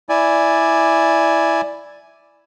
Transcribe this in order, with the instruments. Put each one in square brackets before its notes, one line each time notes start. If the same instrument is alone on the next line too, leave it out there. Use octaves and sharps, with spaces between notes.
[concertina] E4 D5 G#5